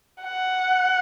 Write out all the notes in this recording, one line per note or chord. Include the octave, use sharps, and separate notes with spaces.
F#5